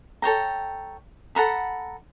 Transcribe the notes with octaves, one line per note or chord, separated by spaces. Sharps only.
A4 C#5 G5 A#5
A4 F#5 A#5 B5